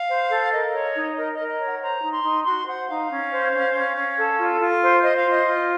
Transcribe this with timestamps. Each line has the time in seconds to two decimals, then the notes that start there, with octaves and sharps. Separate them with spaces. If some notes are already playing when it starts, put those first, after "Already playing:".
Already playing: F5
0.08 C5
0.30 A4
0.51 A#4 D#5
0.73 C#5
0.95 D#4
1.16 A#4 D#5
1.32 D#5
1.38 A#4
1.48 D#5
1.59 C#5
1.65 F#5
1.81 C5 A#5
2.02 D#4
2.13 C6
2.24 D#4
2.45 F#4 C6
2.66 C5 F#5
2.88 D#4 F5
3.10 C#4
3.31 C5
3.53 C#4
3.74 C#4
3.96 C#4
4.17 A4
4.39 F4
4.61 F4
4.82 C5
5.03 C5 D#5
5.17 F5
5.25 F4 D#5
5.46 F4